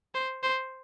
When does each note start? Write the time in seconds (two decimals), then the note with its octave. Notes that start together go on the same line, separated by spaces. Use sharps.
0.14 C5
0.43 C5